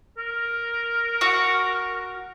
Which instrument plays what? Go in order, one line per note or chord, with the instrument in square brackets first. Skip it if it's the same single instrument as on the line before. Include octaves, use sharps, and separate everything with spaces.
[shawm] A#4
[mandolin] F#4